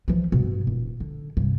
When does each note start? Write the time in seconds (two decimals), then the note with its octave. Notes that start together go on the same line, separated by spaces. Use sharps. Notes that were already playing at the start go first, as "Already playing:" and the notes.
0.08 E3 F3
0.32 G2 B2
0.67 D#1
1.00 D3
1.37 G2 C3